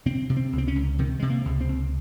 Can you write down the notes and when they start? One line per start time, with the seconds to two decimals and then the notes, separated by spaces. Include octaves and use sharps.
0.06 C3 C4
0.30 C3
0.37 C4
0.53 C#2
0.58 C4
0.68 C#4
0.76 C#2
0.99 C3 D#3
1.19 C3 G#3
1.30 A#3
1.45 C#2
1.61 C4
1.69 C#2